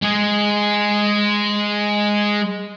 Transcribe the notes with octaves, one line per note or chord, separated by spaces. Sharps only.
G#3 G#4